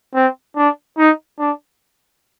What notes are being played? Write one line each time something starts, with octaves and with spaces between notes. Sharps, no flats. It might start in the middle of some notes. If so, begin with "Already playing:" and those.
C4
D4
D#4
D4